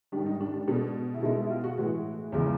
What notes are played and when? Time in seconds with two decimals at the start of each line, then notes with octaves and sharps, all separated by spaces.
0.12 G#2 D#3 G3 D4
0.26 D#4
0.41 D4
0.54 D4
0.68 B2 G#3 D4
1.14 E4
1.23 B2 G#3 D#4
1.36 E4
1.50 F4
1.64 F#4
1.78 A2 E3 G#3 F#4
2.32 E2 C#3 F3 G#3